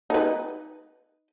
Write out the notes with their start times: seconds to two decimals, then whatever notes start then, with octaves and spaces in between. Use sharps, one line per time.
0.10 D#4 B4